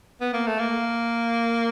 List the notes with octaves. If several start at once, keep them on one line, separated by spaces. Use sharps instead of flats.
B3
A#3
A3
A#3